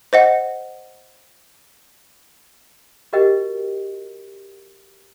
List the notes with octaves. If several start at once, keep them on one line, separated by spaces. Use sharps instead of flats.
C5 D#5 F#5
F#4 G4 A#4 B4 D#5 G5